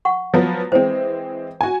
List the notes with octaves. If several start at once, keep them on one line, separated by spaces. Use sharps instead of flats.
F#5 C#6
F3 F#3 B3
E3 G#3 C4 C5
F#4 G#5